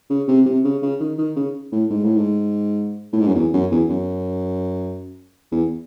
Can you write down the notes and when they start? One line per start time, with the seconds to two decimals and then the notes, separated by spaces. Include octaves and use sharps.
0.10 C#3
0.28 C3
0.46 C3
0.64 C#3
0.82 C#3
1.00 D#3
1.18 D#3
1.37 C#3
1.72 A2
1.91 G#2
2.04 A2
2.17 G#2
3.13 A2
3.20 G#2
3.28 F#2
3.35 E2
3.54 F#2
3.71 E2
3.90 F#2
5.52 E2